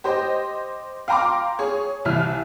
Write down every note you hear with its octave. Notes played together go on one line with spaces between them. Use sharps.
G4 C5 D#5
F5 G5 A#5 C6 D6
G#4 C#5
C2 E3 E5 F6